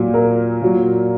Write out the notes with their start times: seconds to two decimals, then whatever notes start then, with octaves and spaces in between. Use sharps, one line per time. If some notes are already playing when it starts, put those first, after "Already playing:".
Already playing: A#2 F#3
0.14 A#4
0.62 A#2 F#3